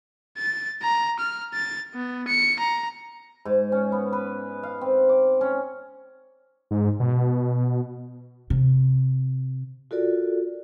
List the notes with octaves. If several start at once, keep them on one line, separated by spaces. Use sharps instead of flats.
A6
A#5
F6
A6
B3
C#7
A#5
G#2
C#4
B3
B4
F5
C4
D6
C#4
G#2
B2
C3
F4 F#4 A4 A#4 D5